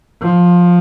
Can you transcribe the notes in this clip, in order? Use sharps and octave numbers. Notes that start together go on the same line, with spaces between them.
F3